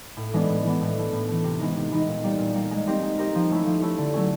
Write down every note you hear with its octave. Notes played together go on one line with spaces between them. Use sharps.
A2
E3 G#3 B3 D4
A2
E3 G#3 B3 D4
A2
E3 A3
A2
E3 A3
C3
E3 G#3 B3 D#4
C3
E3 G#3 B3 D#4
A#2
G3 A#3
A#2
G3 A#3
G#3
C4 D#4 G4 A#4
G#3
C4 D#4 G4 A#4
F3
A3 C#4 E4
F3
A3 C#4 E4
D3
F#3 A3 C#4